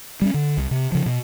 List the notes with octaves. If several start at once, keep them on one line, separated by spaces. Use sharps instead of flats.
G3 C4 C#4
D3
C2
C3
C#3 F3
B2